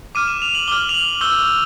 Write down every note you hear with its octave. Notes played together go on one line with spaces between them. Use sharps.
D6 F6 D#7
E7
F7
F#7
D6 F6 G7
F7
F#7
C#6 E6 G6 G7
G7